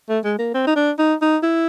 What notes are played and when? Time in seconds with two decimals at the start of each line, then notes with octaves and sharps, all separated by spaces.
0.09 A3
0.24 G#3
0.39 A#3
0.54 C4
0.67 D#4
0.76 D4
0.99 D#4
1.21 D#4
1.43 E4